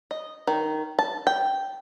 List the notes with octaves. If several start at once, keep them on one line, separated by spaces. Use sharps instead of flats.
D#5
D#3
A5
G5